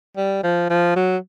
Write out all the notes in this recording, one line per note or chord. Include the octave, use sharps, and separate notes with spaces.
G3
F3
F3
F#3